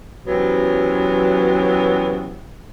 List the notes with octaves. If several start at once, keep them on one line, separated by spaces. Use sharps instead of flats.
F#2 C3 E3 F#3 B3